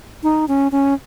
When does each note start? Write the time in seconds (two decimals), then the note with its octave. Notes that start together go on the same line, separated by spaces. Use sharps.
0.23 D#4
0.48 C#4
0.72 C#4